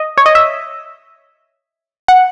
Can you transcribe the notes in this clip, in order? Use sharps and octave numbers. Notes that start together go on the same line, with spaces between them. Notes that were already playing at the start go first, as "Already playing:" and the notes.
Already playing: D#5
C#5
D#5
E5
F#5